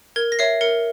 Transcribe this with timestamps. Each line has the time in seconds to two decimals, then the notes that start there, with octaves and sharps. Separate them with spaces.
0.16 A#4 G#6
0.32 A#6
0.39 C#5 E5 C7
0.61 A#4 C#7